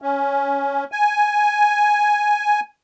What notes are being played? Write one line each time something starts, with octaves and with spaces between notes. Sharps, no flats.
C#4
G#5